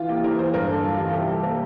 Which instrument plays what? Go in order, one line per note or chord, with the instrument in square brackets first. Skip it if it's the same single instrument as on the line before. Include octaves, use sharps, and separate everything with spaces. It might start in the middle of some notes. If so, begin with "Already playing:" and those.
Already playing: [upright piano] E3 F4
A#3 G4
E2 A#4
E2 C5
G2 A#4
D3 A4
G3 F4
A1 F4
A4
C3 G4
G3 A4
A#3 A#4